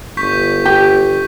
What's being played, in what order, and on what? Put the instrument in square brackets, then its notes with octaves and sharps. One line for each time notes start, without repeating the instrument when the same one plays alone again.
[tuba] G1 [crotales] C#6 G6 B6
[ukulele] G4